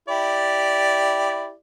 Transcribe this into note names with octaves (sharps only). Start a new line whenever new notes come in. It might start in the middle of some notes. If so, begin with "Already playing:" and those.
E4 G4 D5